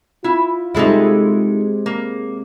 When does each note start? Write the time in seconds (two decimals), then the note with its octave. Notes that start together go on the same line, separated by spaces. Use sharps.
0.24 E4 F4
0.75 C3 G#3 D#4 E4 A4 E5
1.86 A#3